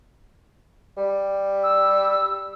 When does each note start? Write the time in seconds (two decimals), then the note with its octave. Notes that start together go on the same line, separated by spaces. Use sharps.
0.97 G3
1.63 E6